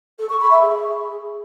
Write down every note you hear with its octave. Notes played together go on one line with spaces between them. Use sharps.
A4
C#6
B5
E5
G#4